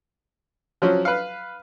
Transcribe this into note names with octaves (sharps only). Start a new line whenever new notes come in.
F3 F#3 C#4
B4 F5